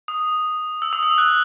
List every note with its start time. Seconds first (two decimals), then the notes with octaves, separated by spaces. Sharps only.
0.08 D#6
0.82 E6
0.93 D#6
1.03 E6
1.18 F#6